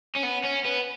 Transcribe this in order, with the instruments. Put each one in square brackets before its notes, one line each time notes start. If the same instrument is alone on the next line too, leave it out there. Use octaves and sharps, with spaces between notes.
[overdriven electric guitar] C#4
B3
C#4
B3